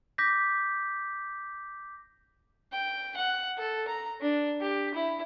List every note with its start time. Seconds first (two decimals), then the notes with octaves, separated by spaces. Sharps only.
0.18 D6 G6 A#6 B6
2.73 G5
3.17 F#5
3.58 A4
3.88 A#5
4.21 D4
4.61 G4
4.94 E4